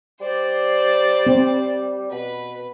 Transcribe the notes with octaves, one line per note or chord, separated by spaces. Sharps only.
G3 C5 D5
C4
B2 B4